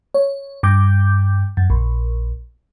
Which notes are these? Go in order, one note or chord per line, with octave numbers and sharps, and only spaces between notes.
C#5
G2 D6 G6
F#2
A#1